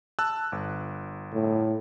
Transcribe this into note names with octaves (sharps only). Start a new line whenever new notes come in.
A5 E6 F#6
G1
A2